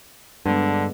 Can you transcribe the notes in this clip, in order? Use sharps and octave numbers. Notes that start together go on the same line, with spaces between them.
G2 D3 G#3 B3 B4